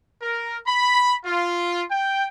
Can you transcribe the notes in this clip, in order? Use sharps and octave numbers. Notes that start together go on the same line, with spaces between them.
A#4
B5
F4
G5